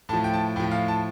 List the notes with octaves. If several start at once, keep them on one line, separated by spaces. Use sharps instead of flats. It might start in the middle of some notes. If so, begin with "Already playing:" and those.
A2 F3 A5
G5
A5
A2 F3 G5
F5
A5